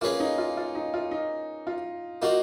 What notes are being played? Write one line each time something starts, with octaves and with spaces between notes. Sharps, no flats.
A#3 C#4 F4 G#4 B4
D#4
F4
F4
D#4
F4
D#4
F4
A#3 D#4 F4 F#4